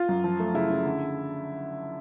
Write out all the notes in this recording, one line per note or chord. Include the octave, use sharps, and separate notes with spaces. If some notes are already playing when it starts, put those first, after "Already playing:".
Already playing: F4
F#2
F3
A3
C#3 E4
C#3
D3